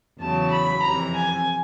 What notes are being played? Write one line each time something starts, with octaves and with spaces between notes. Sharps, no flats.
E2 C#3 F#3 A5
B5
F2 C3 E3 A#5
G#5